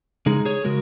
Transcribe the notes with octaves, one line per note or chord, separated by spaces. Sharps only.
C#3 G#3 D#4 G#4
G#4 C#5
C#3 G#3 F#4 A#4